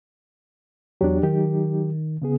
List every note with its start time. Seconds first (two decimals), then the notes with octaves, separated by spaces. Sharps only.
1.01 E2 F#3 D4 G4
1.23 D#3 F#3 D#4 G4
2.22 C#3 B3 G#4